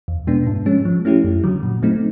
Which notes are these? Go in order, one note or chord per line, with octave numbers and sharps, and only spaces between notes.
E2
B2 G#3 B3 D4
G#2
F3 G#3 C#4
F3
A3 C#4 E4 G4
F#2
D3 F#3
A#2
F#3 A3 C4 D#4